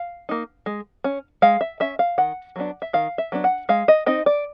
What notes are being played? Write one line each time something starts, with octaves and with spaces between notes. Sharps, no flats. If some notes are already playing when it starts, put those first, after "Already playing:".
Already playing: F5
A#3 D#4
G#3
C#4
G#3 F5
E5
C#4 E5
F5
D#3 F#5
F#3 B3 D4
E5
D#3 F5
E5
F#3 B3 D4
F#5
G#3 F5
D#5
C4 D#4 D#5
D5